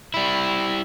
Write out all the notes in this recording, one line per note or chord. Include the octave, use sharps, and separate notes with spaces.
G3 E4